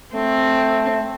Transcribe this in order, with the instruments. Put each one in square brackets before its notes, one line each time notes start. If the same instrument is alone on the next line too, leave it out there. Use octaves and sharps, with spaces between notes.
[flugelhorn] A3 [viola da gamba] C4